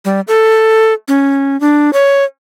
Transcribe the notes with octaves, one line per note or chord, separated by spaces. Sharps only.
G3
A4
C#4
D4
C#5